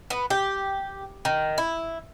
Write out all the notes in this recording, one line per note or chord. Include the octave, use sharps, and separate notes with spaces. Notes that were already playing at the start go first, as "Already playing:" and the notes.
B3
G4
D#3
E4